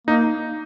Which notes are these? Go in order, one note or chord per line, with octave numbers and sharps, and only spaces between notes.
A#3 D#4